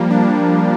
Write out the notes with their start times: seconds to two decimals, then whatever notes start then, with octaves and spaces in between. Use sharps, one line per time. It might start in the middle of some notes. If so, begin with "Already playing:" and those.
Already playing: F3 G3 A#3
0.10 D4